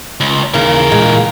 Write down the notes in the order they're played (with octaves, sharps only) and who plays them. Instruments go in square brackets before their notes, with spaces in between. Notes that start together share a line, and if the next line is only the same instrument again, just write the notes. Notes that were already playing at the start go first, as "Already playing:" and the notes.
[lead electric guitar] C#2
[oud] D#2 C#3 [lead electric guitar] E3 A#4
[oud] A#2 G#3